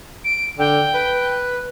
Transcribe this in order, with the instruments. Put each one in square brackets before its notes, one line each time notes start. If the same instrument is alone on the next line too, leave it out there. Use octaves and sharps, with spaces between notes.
[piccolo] D7
[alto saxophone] D3 [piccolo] G5
[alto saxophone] B4